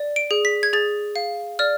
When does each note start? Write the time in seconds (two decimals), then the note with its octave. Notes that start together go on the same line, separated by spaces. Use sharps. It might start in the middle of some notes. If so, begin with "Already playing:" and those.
Already playing: D5
0.16 D7
0.31 G#4
0.45 B6
0.63 G#6
0.73 G#4 A6
1.16 F5
1.59 D5 F6